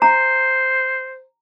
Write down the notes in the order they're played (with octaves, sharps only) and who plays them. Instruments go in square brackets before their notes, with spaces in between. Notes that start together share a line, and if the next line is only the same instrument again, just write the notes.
[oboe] C5 [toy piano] A#5